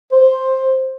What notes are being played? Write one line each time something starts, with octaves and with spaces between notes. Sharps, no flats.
C5